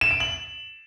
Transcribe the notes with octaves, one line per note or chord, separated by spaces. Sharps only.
E7
D7
F#7